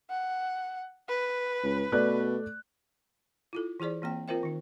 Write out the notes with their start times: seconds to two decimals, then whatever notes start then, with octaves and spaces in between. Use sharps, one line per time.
0.10 F#5
1.08 B4
1.63 C#2
1.92 B2 A3 D5 F#6
3.53 E4 F4 A4
3.80 E3 E4 G#4 C5 D5
4.02 E3 A#3 C4 G5
4.28 C4 F4 A#4 C5 E5 G5
4.43 D#3 D#4